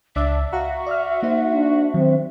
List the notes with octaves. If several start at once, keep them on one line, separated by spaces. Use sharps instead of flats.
C#2 D4 E5 D6 E6
F#4 F5 A#5
D5 E6 F6
A#3 D#4 C5
D4
D#3 F#3 C4